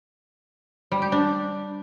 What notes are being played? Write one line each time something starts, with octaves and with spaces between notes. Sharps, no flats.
G3
G4
D4